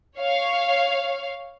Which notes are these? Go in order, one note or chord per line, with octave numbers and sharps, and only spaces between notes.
C#5 F5